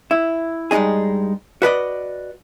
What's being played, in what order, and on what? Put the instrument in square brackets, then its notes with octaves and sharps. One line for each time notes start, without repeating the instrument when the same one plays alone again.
[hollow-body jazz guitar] E4
G2 G3 G#3 D#4 G#4
F#4 B4 D5 D#5